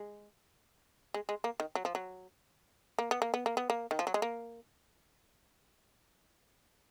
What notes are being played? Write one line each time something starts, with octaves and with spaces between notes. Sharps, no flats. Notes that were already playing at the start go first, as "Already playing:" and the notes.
Already playing: G#3
G#3
G#3
A#3
D#3
F#3
F3
F#3
A#3
B3
A#3
B3
A#3
B3
A#3
D#3
F3
F#3
G#3
A#3